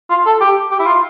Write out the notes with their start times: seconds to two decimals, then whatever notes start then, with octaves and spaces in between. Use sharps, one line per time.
0.10 F4
0.26 A4
0.41 G4
0.71 G4
0.80 E4
0.87 F4